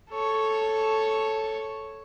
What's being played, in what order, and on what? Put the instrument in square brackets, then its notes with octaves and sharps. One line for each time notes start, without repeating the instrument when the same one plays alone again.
[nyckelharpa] A4 C#5